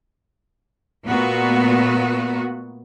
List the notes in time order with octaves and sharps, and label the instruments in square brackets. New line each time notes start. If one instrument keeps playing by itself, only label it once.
[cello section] A#2 A3 B3 F#4